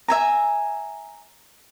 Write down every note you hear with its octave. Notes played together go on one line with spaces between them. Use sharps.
E5 G#5 A#5